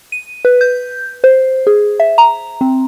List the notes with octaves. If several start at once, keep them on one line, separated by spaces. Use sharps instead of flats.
D#7
B4
G6
C5
G#4
E5
A#5
C4